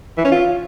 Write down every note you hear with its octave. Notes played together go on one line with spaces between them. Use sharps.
E3
C#4
F4